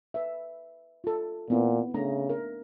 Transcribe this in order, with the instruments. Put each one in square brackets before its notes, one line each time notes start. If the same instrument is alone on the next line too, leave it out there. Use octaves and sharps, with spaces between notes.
[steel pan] B4 E5
F4 A4
[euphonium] A#2 [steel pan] B3 C4 E4
[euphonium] C#3 [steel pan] A3 D4 A#5
[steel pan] A#4